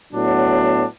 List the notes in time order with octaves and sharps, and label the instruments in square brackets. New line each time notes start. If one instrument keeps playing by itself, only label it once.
[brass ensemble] A2 F#3 B3 D4